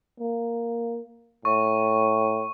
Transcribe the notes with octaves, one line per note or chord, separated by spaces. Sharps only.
A#3
A2 C#6